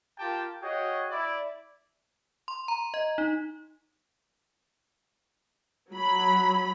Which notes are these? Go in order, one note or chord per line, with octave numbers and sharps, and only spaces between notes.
F4 G4 A#4 G5 A5
F#4 G#4 C#5 D#5 F5 G5
E4 D5
C6
A#5
D#5
D#4
F#3 B5